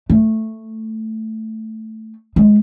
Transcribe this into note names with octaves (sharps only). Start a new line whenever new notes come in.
A3
G#3